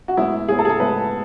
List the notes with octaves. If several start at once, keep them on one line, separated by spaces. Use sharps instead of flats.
F#4
A2 G#3 B3 E4
A2 G#3 B3 G#4
A4
G#4
A4
A2 G#3 B3 B4